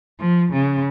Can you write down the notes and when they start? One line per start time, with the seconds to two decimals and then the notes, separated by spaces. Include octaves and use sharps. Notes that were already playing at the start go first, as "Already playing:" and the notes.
0.20 F3
0.52 C#3